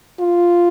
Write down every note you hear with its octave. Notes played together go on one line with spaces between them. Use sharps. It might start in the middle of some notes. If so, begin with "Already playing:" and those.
F4